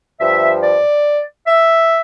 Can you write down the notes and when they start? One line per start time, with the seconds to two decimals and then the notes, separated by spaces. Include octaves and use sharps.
0.20 G2 F3 E5
0.62 D5
1.47 E5